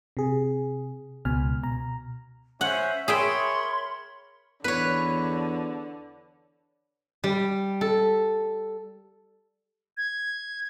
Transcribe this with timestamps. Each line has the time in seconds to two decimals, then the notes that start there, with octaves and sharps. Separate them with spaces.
0.17 C3 G#4
1.25 C#2 B2 G#5 F6
1.63 B2 A#5
2.61 C#4 C5 E5 F#5
3.08 G#4 A#4 C#5 E5 G5 B5 C6
4.64 E2 D3 B4 C#5
7.24 G3
7.81 A4
9.97 G#6